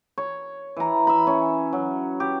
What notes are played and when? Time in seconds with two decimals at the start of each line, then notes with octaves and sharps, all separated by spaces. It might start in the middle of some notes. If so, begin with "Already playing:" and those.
0.18 C#5
0.77 E3 A#5
1.07 E5 B5
1.27 C#4
1.73 F#3
2.20 G4